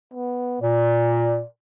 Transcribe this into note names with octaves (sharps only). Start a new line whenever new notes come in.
B3
A#2 D5